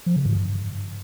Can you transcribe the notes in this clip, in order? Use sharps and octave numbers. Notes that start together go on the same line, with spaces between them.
F3
C#3
G#2
G2